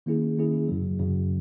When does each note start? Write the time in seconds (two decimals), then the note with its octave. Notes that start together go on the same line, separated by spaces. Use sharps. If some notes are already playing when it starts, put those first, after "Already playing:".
0.06 D#3 A#3 C#4 E4 G#4
0.37 D#3 A#3 C#4 E4 G#4
0.68 F#2 C#3 F#3
0.99 F#2 C#3 F#3